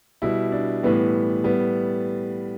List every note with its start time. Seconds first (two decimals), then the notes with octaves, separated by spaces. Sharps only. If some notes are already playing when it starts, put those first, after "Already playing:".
0.22 B2 G3 E4
0.52 D4
0.83 A2 E3 G3 B3
1.44 A2 G3 B3